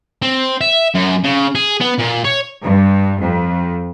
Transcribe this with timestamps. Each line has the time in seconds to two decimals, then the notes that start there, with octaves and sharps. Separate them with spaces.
0.22 C4
0.61 E5
0.95 F#2
1.24 C#3
1.55 G#4
1.81 B3
1.98 A#2
2.24 C#5
2.62 G2
3.19 F2